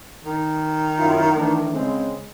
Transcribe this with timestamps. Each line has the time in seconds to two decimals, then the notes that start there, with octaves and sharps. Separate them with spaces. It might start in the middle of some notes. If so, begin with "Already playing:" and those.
0.25 D#3
0.99 F#2 E4 F4
1.35 E3 A3 D4
1.73 C#3 G#3 C4